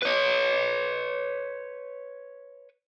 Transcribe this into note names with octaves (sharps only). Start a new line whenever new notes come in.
B4 C#5